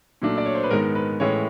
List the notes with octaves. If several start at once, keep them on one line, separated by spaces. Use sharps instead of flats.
A#2 F#3 A3 D4
D5
C#5
C5
B4
G#2 D#3 G#3 B3 A#4
B4
A2 E3 G#3 C#4 C#5